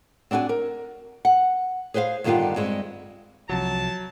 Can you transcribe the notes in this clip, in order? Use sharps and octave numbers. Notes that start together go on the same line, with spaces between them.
C4 D4 F#4 G5 G#5
A#4
F#5
G#4 B4 C5 E5 F5
G2 D3 D#3 B3 F4 G4
G2 G#3 C4
C2 C3 F3 F#3 A5